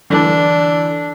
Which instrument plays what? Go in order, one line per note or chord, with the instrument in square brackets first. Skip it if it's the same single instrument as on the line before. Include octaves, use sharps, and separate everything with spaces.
[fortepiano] D3 E3 [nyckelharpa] D4